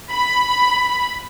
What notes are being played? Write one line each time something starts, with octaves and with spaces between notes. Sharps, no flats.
B5